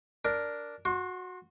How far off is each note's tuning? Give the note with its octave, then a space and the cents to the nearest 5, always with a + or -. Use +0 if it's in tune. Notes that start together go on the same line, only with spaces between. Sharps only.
D4 +0 A#4 +0
F#4 -15 C6 +25